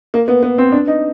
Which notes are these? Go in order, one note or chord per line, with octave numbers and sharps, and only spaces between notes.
A#3
B3
B3
C4
D4
D#4